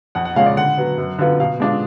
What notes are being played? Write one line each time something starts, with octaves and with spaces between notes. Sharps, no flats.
F2 F#5
F#5
C#3 G#3 C#4 F4 F5
D5
D3 F#5
F#3 B3
F#2
D3 F#3 B3 F4
B2 F5
G#3 D4 F4